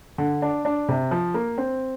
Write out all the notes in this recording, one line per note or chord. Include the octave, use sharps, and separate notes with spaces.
D3
D4
D4
C3
F3
A#3
C4